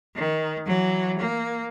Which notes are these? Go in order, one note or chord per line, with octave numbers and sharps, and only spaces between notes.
D#3
E3 F#3
A#3